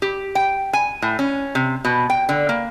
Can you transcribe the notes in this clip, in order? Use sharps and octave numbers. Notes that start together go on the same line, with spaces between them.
G4
G5
G#5
A2
C#4
C3
B2
G5
D3
A#3